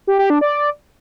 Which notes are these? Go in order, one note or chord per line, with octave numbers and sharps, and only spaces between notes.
G4
G4
D4
D5